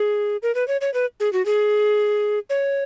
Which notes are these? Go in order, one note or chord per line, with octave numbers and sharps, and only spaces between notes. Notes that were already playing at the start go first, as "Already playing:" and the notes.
Already playing: G#4
A#4
B4
C#5
C#5
B4
G#4
F#4
G#4
C#5